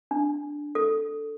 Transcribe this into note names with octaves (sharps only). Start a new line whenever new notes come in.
D4
A4